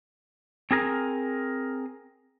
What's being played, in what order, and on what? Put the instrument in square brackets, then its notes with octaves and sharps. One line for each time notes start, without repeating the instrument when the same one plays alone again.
[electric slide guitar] C4 G#4 A#4